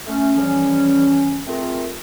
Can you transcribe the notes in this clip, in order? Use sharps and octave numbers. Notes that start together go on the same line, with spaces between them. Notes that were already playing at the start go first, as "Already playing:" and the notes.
A3 C#4
C#3 E3 F3 G3 C#4
A3 C4 F4 G#4 A#4